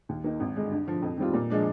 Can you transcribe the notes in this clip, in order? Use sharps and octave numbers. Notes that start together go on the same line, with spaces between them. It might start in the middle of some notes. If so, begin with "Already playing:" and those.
D#2
D#3 A#3 D#4
G#1
G2 D3 G#3
G2
D3 F3
F2
D#3 G3 C4 F4
A#2
F3 G#3 D4